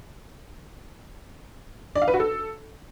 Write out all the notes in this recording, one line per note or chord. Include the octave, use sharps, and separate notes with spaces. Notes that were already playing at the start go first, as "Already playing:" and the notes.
D5
F5
B4
F#4
A4